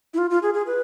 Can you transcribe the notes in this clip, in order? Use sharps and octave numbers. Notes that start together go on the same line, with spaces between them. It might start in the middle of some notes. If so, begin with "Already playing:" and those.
E4
F4
F4
G#4
G#4
B4